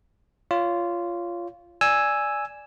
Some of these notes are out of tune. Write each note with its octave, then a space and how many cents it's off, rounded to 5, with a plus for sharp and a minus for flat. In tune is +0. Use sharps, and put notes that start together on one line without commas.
F4 -10 C#5 +20
D5 +0 G#5 +0 E6 +0